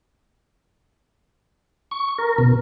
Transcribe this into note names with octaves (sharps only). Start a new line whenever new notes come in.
C#6
A#4
B2